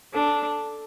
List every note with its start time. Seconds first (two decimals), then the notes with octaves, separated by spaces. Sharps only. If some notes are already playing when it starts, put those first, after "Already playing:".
0.14 D4 A4